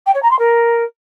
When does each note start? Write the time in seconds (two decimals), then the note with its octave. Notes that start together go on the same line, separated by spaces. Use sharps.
0.06 G5
0.15 C#5
0.23 A#5
0.31 C6
0.39 A#4